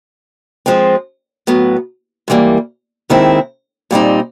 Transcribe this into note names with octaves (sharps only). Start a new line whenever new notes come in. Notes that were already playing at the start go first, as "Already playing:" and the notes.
F3 G#3 C4
A2 F#3 B3
G#2 E3 G3 A#3
D#2 D#3 G#3 C4 E4
A#2 G3 C4 D#4